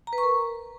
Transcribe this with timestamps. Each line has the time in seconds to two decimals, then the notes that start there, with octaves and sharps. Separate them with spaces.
0.07 A#5
0.13 B4
0.18 C#6
0.23 A#4